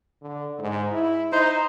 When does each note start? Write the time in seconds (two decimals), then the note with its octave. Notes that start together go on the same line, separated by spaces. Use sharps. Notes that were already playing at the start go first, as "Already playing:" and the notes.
0.22 D3
0.59 G#2
0.92 E4
1.32 D#4 C5